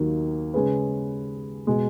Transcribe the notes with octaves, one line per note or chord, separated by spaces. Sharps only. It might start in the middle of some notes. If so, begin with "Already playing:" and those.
Already playing: D#2 D#3 F#3 A#3 D#4
C#3 G#3 C#4 G#4 B4
B2 G#3